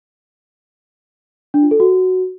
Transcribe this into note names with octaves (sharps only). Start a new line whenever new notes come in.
D4
F4
A4
F#4